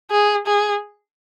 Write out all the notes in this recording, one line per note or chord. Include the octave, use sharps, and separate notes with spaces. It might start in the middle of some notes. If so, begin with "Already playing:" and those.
G#4
G#4